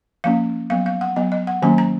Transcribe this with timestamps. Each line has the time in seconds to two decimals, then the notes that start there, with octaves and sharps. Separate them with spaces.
0.24 F3 A#3 C#4 F5
0.70 F#3 B3 F5
0.86 F5
1.01 F#5
1.16 F#3 B3 D#5
1.32 D#5
1.47 F#5
1.62 D#3 F#3 A#3 C#4 G#5
1.78 A#5